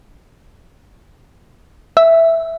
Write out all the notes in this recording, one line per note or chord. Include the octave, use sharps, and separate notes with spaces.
E5